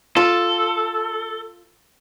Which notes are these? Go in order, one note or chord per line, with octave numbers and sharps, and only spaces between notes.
F4 A4